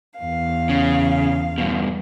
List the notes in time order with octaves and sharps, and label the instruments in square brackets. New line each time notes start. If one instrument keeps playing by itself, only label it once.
[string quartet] E2 F5
[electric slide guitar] C#3
G2 B2